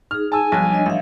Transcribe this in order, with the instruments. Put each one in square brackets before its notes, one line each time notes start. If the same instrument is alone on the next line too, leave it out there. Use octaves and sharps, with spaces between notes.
[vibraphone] D#4 G#4 [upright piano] F6
[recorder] G#5 [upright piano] A5 E6
[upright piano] B1 [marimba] F3 G3 F#6 [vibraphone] A5
[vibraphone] D4 C#5 D#5
[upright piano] A1 [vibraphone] E5 F5